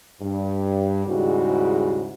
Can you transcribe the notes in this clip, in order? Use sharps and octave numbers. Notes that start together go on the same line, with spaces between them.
G2
D#2 G#2 C#3 G3 E4 F#4